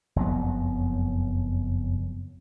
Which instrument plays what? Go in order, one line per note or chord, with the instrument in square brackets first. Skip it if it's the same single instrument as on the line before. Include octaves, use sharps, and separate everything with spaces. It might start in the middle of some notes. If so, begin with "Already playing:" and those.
[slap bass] F#1 F2 F#3 B3